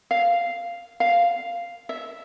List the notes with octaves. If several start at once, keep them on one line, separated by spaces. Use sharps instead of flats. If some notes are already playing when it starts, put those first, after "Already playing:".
F5
F5
E5